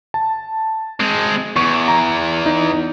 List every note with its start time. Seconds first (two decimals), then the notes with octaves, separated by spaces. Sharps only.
0.14 A5
1.00 G#3 C4
1.56 E2 C#6
1.88 A#5
2.46 D#4